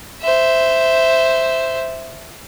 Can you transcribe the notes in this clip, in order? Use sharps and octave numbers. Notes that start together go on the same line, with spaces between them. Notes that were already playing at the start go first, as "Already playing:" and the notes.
C5 E5